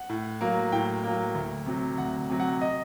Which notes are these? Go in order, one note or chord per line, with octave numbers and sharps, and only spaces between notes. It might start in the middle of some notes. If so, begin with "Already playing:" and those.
Already playing: F#5
A2
F#3 A#3
A2 G5
F#3 A#3
D2
C3 F#3
D2 F#5
C3 F#3
F#5
D#5